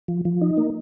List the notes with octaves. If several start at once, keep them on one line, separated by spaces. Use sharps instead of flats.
F3
F3
D#4
A#3